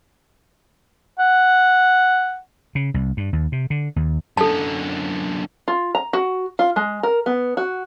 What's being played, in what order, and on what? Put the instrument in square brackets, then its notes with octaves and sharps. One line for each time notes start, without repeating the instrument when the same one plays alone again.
[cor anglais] F#5
[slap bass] C#3
C2
G2
D#2
C3
D3
D#2
[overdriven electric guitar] F#2 D3 [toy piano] A4 A5
[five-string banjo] F4
A#5
F#4
F4
G#3
A#4
B3
F#4